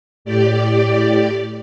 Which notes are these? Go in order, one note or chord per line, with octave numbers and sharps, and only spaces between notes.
A2 G4 D5